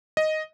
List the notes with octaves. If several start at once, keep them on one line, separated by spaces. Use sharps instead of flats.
D#5